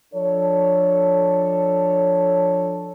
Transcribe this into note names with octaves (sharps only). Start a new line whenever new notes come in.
F3 D4 A4 C#5